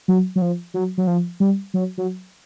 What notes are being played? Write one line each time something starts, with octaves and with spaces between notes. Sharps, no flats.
F#3
F#3
F3
F#3
F#3
F3
G3
F#3
F#3